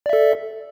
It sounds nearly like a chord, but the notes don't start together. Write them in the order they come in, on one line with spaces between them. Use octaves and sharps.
D5 E5 A4